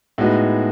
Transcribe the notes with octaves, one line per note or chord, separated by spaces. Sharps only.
A2 G#3 B3 D#4 F#4